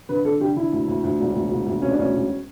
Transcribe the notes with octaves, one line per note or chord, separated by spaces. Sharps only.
D3 B4
D3 A4
D3 G4
D3 E4
D2
D2
D2
E1
D2
E1
D2
E1 C#4
D4
D2 C#4
E1